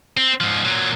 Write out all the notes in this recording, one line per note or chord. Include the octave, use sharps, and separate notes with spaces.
C4
G#2 F3
A#2 F#3